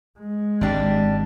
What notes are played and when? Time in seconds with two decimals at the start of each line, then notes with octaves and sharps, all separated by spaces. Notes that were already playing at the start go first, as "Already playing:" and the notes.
0.19 G#3
0.61 G#1 G3 D4 G4